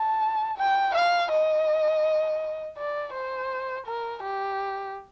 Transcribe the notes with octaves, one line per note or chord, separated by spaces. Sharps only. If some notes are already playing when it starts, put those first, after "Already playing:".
Already playing: A5
G5
F5
D#5
D5
C5
A#4
G4